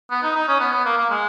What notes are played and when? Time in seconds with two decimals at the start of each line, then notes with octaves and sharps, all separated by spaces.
0.11 B3
0.23 D#4
0.36 D#4
0.48 C#4
0.60 B3
0.73 B3
0.85 A#3
0.98 A#3
1.10 G#3